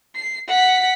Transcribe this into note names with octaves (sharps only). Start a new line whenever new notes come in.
C7
F#5 B6